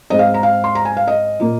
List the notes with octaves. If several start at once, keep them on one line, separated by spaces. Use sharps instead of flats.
G#2 G#3 C4 D#4 D#5
F5
A#5
F5
C6
A#5
G#5
F5
D#5
A#2 A#3 F4